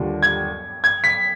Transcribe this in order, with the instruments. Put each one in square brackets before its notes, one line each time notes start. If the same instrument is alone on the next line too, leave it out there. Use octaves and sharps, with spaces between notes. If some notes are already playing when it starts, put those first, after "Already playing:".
Already playing: [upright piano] D#2 D3 G3 D4 F4
[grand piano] G#6
G#6
B6